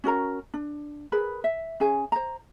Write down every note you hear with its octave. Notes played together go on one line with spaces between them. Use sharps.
C#4 F#4 A#4 A#5
D4
G#4 A#4 B4 B5
E5
C#4 G#4 G#5
C5 A#5